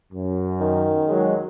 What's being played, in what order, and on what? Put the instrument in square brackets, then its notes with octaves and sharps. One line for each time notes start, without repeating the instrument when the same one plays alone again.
[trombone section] F#2
[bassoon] D#3
[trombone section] F#3 G#3